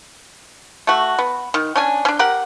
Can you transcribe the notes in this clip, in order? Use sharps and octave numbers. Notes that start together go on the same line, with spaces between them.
A3 F#4
B3
D#3
C#4 D4 G#5
C#4 D4
G4 A#4 F#5